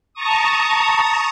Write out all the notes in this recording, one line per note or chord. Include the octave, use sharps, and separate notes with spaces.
A5 A#5 C#6 D#6